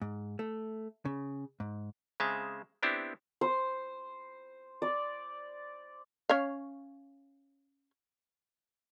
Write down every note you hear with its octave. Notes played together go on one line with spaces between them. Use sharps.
G#2
A3
C#3
G#2
C#3 G#3 C4 E5 A5
B3 C4 D4 E4 G4
C5
D5
C#4 C#5 F5